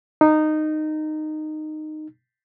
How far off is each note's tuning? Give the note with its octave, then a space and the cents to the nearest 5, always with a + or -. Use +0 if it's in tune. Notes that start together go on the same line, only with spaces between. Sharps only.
D#4 -15